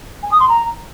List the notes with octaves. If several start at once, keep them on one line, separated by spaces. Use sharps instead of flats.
G#5
D#6
C6
A#5